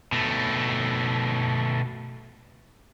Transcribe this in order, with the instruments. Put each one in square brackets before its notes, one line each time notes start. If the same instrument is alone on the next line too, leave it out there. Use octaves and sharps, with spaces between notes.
[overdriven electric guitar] B2 A3